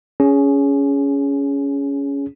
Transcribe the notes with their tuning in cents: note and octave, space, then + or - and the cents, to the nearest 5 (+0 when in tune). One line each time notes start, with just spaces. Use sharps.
C#4 +15 G#4 +0